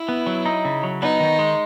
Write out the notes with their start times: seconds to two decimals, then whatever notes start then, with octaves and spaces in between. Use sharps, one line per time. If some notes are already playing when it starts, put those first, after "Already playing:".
Already playing: E4
0.08 B3
0.27 F#3
0.46 D#4
0.65 C#3
0.83 F#3
1.02 B3 D#4
1.20 D#3
1.39 G#3